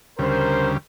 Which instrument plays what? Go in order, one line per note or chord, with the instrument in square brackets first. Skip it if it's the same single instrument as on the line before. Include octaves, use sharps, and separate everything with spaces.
[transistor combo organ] D2 C#3 G3 [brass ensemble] A#4 C5